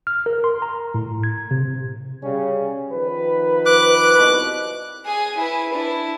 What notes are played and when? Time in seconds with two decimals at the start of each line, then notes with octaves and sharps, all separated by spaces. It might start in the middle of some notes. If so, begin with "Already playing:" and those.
0.07 F6
0.26 A#4
0.44 C6
0.62 A#5
0.94 A2
1.24 G#6
1.51 C3
2.22 C#3 G3 C#4
2.92 D#3 F3 B4
3.66 D6 F#6
4.16 C2 B2
5.06 G#4 G#5
5.38 E4 B4
5.74 D4 E4